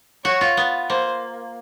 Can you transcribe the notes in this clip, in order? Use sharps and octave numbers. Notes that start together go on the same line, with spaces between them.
F#4 C#5
F4
B3
A#3 C5